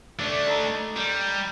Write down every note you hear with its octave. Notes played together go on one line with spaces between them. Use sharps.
A3 D4 D5
D#4 A4 B5
G3 C5